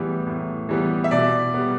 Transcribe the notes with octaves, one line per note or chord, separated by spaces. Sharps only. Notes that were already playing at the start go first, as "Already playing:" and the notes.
Already playing: A2 E3 G3 B3
A2
E3 G3 B3
E5
B2 D5
G3 B3